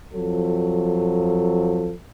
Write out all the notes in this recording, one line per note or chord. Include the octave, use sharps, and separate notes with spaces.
F2 F3 F#3 A4